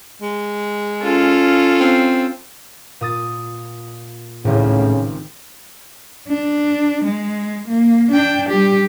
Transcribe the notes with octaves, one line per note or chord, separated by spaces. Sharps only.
G#3
C#4 F4 A4
C4
A#2 D#6 A6
G#1 C#2 A2 C#3
C4
D4
G#3
A#3
D4 G5
G3 G4